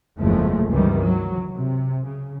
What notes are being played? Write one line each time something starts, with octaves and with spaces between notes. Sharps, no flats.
F#1 E2 F3 G#3 A3
C#2 G2 C3 D#3 E3 G3
F#3
C3
C#3